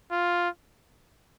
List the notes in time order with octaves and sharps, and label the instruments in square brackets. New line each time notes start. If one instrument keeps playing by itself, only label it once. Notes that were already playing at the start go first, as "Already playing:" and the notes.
[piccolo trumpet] F4